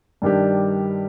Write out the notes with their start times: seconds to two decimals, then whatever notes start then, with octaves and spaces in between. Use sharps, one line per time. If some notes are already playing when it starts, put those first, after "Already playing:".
0.22 G2 D#3 G3 D4 G4